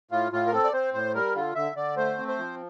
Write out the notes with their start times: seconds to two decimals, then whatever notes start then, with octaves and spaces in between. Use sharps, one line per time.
0.11 A2 F4
0.32 A2 F4
0.46 A#4
0.52 C4 A4
0.64 D5
0.73 C4 C5
0.94 A2 C5
1.14 G3 A#4
1.35 D3 F4
1.55 D3 E5
1.76 D3 D5
1.97 A3 C5
2.18 C4
2.28 C5
2.38 F3